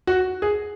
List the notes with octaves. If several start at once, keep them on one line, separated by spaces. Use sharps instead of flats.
F#4
G#4